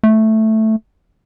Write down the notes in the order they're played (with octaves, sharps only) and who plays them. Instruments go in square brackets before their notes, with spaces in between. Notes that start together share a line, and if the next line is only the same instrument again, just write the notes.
[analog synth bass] A3